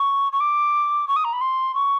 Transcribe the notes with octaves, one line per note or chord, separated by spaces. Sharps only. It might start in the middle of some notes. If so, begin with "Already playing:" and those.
Already playing: C#6
C#6
D6
C#6
D#6
A#5
B5
C6
C#6